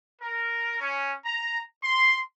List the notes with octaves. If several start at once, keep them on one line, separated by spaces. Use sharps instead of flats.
A#4
C#4
A#5
C6